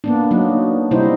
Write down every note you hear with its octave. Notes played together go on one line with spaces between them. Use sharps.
A#3 B3 D4
F#3 A#3 D#4
C3 G3 D#4 E4 C5